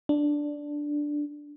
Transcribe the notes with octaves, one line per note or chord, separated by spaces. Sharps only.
D4